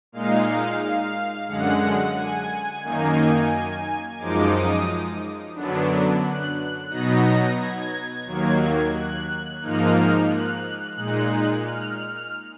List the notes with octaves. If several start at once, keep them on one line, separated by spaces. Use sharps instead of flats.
A#2 G#3 D#4 F5
F#2 D3 G#3 F#5
G#5
F#2 D#3 A#3 D#4
F#2 F3 G#3 D#4 D6
D#6
F#2 D3 F#3 B3 D4
F#6
B2 F#3 B3 D#4 A#6
G#6
D#2 D#3 F#3 A#3
F#6
G#2 F3 A#3 D#4 F6
F#6
A#2 G#3 D#4
F6